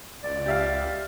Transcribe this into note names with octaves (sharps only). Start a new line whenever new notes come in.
C#2 D5
G4 E5 F5